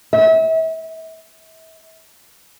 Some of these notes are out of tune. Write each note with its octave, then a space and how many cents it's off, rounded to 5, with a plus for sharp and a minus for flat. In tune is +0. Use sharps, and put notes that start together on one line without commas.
E5 -35